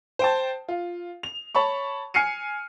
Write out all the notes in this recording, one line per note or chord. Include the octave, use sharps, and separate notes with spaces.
C5 G5 A5
F4
F7
C#5 A5 B5 C#6
G#5 F6 C7 C#7 D#7